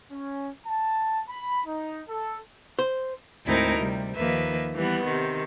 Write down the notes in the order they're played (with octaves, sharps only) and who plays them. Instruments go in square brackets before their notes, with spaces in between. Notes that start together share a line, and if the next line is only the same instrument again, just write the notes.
[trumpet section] C#4
A5
B5
D#4
A4
[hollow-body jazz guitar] C5
[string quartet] D2 G#2 C4 D#4 E4 A#4
C3 G3
D#2 D#3 F3 A#3 B4 E5
E3 G3 B3
C3 D#3